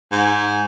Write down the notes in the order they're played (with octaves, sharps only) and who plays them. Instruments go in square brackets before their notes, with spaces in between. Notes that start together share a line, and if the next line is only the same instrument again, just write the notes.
[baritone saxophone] G#2